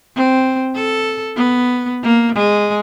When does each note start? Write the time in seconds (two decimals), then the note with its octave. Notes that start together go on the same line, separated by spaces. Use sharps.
0.15 C4
0.75 A4
1.36 B3
2.03 A#3
2.35 G#3